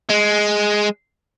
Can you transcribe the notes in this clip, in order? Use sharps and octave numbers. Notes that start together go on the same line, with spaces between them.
G#3